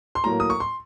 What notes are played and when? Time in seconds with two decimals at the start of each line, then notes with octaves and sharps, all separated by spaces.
0.15 C6
0.24 A2 F#3 A#3 A#5
0.40 D#6
0.50 C#6
0.60 C6